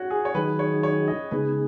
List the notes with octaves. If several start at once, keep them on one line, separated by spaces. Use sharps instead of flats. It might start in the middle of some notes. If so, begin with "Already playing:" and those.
Already playing: F#4 C#5
G#4
C#5
D#3 F#3 D#4 G#4 B4
C#5
C#5
D#5
C#3 G#3 B3 D#4 G#4 B4